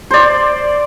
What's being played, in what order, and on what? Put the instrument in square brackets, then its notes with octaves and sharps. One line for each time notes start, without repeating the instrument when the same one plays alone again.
[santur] C5 D5